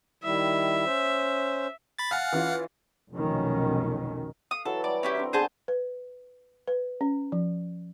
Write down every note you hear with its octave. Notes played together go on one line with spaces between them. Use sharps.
D#3 G3 E4 E5
C#4 C5
B5 A6
F5 F#5 G#5 F6 A6
E3 C#4 F4
F1 B1 B2 D#3 C#4
F5 D#6
E3 F#3 A4
G3 D5 F#5
C#4 E4 G4
C4 D4 A#4
D3 B3 G#4 A4 C5 A5
B4
B4
C#4
F3